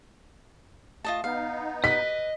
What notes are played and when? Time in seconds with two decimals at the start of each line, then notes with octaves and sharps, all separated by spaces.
1.05 A3 F4 D#5 A5
1.24 B3 D#4 F5
1.84 B4 D#5 B5 B6